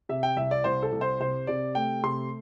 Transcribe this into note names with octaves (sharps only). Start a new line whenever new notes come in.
C3 E5
G5
C2 E5
D5
C2 C5
A4
C2
C5
C3 C5
C3 D5
A3 G5
C3 C6